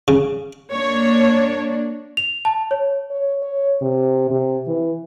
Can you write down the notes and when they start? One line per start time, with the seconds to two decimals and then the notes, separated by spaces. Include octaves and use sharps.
0.08 C#3
0.73 A#3 D4 C#5
2.17 F7
2.45 A5
2.71 C#5
3.11 C#5
3.43 C#5
3.82 C3
4.31 C3
4.67 E3